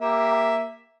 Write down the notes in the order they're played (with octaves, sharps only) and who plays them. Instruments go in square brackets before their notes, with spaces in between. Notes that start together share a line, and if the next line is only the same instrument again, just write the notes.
[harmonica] A#3 G4 E5